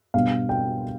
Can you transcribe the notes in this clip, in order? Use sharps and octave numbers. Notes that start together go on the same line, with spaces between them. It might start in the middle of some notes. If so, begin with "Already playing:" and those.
B2 G3 B3 D4 F5
G5